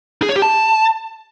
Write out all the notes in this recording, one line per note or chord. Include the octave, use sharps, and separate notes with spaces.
G#4
C#5
G4
A5